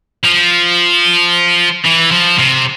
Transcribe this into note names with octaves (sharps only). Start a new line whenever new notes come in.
F3
E3
F3
C3